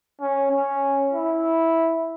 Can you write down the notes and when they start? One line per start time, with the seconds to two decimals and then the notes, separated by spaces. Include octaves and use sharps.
0.21 C#4
0.52 C#4
1.12 E4